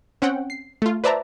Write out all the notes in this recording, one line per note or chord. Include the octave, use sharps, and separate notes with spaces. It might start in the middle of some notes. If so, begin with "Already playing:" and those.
C4 C#4 F#5 G5
C7
A3 F4
B4 C5 D5 E5 A5 A#5